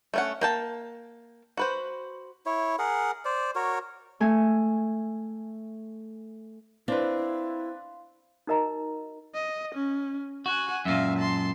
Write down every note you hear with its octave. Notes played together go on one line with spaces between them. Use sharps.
A3 C#4 F#5
A#3 G5 A5
F#4 B4 C5
E4 C#5
G#4 A#4 F#5
C5 D5
F#4 A#4 C#5
A3 G#5
C4 D4 E4 B4 F5 C6
D#4 F#4 A#4 D#5 A#5
D#5
C#4
F#4 F#5 G#5
F#2 A#2 E5 F5
A5 C6